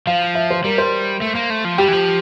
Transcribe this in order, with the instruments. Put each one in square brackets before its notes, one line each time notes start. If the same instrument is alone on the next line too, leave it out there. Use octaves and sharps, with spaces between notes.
[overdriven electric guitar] F3 [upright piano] F5
[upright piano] E5
C5
[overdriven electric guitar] G3 [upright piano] A#4
[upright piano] C5
[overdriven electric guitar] A3
A#3
A3
F3
[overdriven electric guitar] G3 [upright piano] G4
[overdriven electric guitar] E3
F3